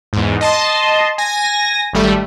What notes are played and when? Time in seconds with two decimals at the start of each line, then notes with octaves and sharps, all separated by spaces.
0.13 E2 G#2
0.41 D#5 A5 C6
1.18 G#5 A#6
1.93 G#1 G3 A3